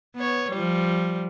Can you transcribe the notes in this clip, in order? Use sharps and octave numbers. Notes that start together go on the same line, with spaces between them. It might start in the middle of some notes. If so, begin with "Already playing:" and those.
B3 C#5
F3 G3